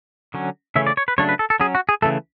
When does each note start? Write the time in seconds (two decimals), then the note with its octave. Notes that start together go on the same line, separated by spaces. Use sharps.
0.34 D3 F#3 C#4
0.76 C#3 E3 A3 C#4 E5
0.87 D5
0.97 C#5
1.08 B4
1.18 C#3 F#3 A3 D4 C#5
1.29 B4
1.39 A4
1.50 A4
1.60 F#3 C#4 G#4
1.75 F#4
1.89 G#4
2.02 C#3 E3 A3 A4